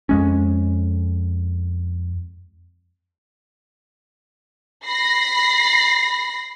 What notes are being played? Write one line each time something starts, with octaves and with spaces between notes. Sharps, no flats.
F2 G#3 C#4
B5 A#6 C7